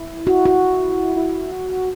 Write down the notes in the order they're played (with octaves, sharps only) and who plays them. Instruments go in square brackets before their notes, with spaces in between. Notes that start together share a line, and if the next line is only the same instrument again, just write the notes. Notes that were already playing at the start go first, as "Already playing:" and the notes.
Already playing: [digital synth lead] E4
[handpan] F#4
F#4
[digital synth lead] E4
F#4